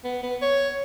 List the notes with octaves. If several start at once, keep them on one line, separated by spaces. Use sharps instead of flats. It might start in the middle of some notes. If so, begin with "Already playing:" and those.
B3
B3
C#5